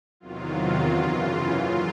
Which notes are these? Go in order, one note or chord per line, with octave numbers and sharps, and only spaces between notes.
E2 C3 D#3 F#3 F4
F#2 C#3 E3
A#2 F#3 F4